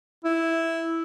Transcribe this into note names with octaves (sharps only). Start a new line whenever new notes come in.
E4